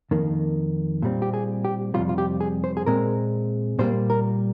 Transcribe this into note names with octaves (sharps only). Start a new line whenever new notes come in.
F2 D#3 A#3
A#2 G3 C4
G4
G#4
G4
F2 C3 G3 F4
F4
G4
G#4
C5
G#4
A#2 G#3 C4 A#4
A#2 G3 A#3 C5
A#4